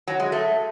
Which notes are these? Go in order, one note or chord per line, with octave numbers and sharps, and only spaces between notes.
F#3
G#3
A3